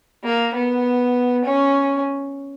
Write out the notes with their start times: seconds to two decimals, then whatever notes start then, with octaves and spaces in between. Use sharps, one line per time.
0.24 A#3
0.54 B3
1.45 C#4